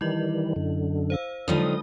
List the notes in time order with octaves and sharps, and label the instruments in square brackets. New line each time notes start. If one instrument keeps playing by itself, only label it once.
[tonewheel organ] D#3 E3 G3 [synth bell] E4 D#5
[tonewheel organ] F#2 D3
[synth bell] C5 F5 E6
[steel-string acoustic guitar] D3 F3 D#4 [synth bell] F#3 G#3 D4 [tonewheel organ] D#6